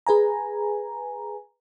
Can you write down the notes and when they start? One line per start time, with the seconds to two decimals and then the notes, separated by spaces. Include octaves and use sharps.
0.07 G#4 B4 G#5 A#5